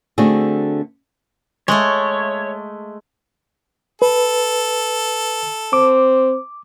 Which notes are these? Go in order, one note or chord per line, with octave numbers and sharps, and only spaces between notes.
D3 A3 C4 D4 F#4 G#4
G#3 A3 C#5
A4 B4
C4 D6